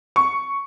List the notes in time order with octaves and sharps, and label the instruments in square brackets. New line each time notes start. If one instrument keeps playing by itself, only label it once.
[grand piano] C#6